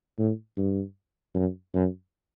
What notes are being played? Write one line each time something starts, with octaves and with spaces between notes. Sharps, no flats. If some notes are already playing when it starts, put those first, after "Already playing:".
A2
G2
F#2
F#2